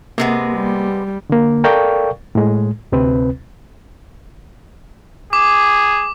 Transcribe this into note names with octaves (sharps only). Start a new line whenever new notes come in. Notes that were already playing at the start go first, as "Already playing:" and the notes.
C3 G#3 A#3 B3
G3
D3 A#3
A4 A#4 D5 F5 G5 C#6
A2 G#3
D2 C3 C4 B4
G#4 D6